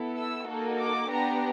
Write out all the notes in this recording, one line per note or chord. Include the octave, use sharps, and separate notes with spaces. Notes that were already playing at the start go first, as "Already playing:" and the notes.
Already playing: B3 E4 A4
E6
A#3 D#4 F#4 A4
D6
B3 D4 G4 A#5